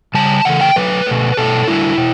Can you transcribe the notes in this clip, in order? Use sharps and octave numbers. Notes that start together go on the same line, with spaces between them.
C#3 G3 A5
C#3 E3 A3 F#5
G5
D3 F#3 A3 B4
B2 A3
B2 A3 A4
D3 G3 E4
B2